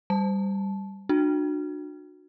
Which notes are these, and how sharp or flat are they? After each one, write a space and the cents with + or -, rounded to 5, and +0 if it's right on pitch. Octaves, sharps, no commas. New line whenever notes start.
G3 +0 A5 -15
D4 +30 F#4 -20